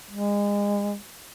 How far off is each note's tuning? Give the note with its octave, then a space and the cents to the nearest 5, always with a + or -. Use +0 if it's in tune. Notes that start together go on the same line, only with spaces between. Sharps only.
G#3 -30